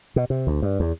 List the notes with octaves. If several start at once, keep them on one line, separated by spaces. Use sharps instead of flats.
B2
C3
D2
G2
E2